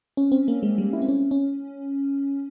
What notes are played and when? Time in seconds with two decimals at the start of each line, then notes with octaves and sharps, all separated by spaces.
0.17 C#4
0.32 C4
0.48 A#3
0.63 G#3
0.78 G3
0.93 E4
1.02 C4
1.08 C#4
1.31 C#4